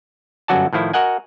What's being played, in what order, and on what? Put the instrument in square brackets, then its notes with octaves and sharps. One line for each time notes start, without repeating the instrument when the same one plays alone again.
[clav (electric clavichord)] G1 F#2 F#3 F#4 D5 A5
A2 D#3 F3 E4
F#4 A#4 D#5 F#5 G#5